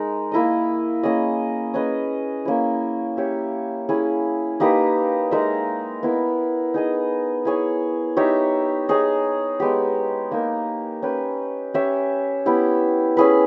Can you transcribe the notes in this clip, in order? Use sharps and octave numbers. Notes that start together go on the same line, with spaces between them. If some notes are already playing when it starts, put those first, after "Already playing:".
Already playing: G#3 D#4 A#4
A#3 E4 A#4 D#5
A#3 C#4 G#4 D#5
C#4 G#4 B4 D#5
A#3 C#4 E4
C#4 G4 C#5 E5
C#4 E4 G#4
A#3 D#4 G4 B4
G#3 D#4 A#4 E5
B3 E4 A#4
D#4 G#4 D#5
E4 G#4 C#5
D#4 G4 C#5 E5
D#4 G#4 C#5
G#3 B3 G4
A#3 D#4 A#4
C#4 G4 B4
C#4 G4 C#5 E5
B3 E4 G4
C#4 E4 G#4 B4